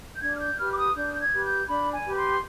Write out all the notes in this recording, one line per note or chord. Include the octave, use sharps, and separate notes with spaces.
G6
D4 G#6
F6
G6
G4 B4 F6
D6
D#6
D4 G6
G6
G#6
G4 B4
G6
D4 B5
G#5
G4 B4
B5
C6